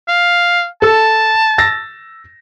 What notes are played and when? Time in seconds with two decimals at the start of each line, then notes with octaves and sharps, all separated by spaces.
0.08 F5
0.82 A4 A5 E6
1.58 E6 A6 A#6